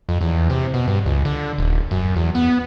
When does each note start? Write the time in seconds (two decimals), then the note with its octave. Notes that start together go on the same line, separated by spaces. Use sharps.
0.09 F2
0.21 E2
0.50 C3
0.74 B2
0.87 G2
1.06 C#2
1.25 D3
1.58 D#1
1.91 F#2
2.16 E2
2.35 B3